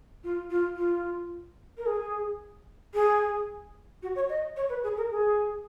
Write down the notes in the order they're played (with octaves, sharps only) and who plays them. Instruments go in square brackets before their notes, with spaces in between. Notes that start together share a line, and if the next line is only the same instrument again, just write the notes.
[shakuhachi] F4
F4
F4
A#4
G#4
G#4
F#4
C#5
D#5
C#5
B4
G#4
A#4
G#4